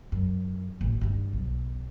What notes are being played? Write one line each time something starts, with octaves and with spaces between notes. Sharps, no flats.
F#2
A1 D#2
G2 G3
B1